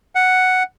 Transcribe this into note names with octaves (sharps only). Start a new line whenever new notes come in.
F#5